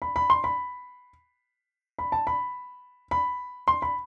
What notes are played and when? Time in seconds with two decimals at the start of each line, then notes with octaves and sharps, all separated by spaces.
0.02 B5
0.16 B5
0.30 C6
0.44 B5
1.99 B5
2.12 A5
2.27 B5
3.11 B5
3.68 C6
3.82 B5